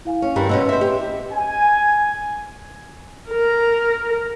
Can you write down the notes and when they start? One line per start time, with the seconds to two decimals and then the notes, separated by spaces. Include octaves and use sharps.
0.05 E4 F5 G#5
0.22 C#4
0.36 G2 D#3 G3 A#5
0.49 B2 C4 C#4 B4 D#5 E6
0.69 C5 E5
0.81 G4
1.32 G#5
3.30 A#4